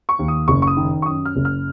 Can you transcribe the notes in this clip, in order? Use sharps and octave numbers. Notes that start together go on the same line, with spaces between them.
C#6
D#2
D#6
F#1 C#6
C#6
D#6
D#3
C#6
F#2 D#6
F6
F#1
F6